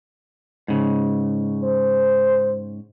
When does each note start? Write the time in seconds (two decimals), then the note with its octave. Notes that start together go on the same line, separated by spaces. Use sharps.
0.68 G#2 C#3
1.64 C5